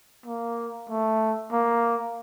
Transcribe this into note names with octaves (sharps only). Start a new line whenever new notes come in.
A#3
A3
A#3